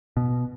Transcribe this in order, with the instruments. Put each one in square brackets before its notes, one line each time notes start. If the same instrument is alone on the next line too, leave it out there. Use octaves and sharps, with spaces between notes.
[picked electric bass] B2